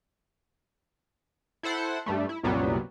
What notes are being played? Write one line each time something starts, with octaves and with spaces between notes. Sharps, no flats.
E4 A4 C5 F#5
G2 G3 A3
E4
C2 F#2 A#2 F#3 G3 B3